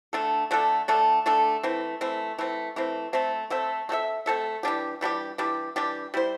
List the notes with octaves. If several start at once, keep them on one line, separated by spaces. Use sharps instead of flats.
D3 A3 D4 A4
D3 A3 D4 A4
D3 A3 D4 A4
D3 A3 D4 A4
E3 A3 C4
E3 A3 C4
E3 A3 C4
E3 A3 C4
A3 C4 A4 E5
A3 C4 A4 E5
A3 C4 A4 E5
A3 C4 A4 E5
E3 G3 D4 G4
E3 G3 D4 G4
E3 G3 D4 G4
E3 G3 D4 G4
G3 E4 C5